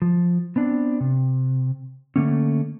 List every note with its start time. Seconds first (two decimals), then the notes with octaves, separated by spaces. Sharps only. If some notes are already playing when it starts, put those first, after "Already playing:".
0.02 F3
0.56 B3 C4 D4
1.00 C3
2.16 D3 A3 A#3 C#4